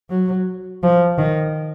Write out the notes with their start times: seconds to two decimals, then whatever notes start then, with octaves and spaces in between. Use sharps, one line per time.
0.10 F#3
0.83 F3
1.19 D#3